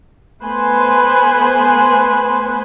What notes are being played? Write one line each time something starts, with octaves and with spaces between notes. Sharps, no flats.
A3 B3 B4 C5 G#5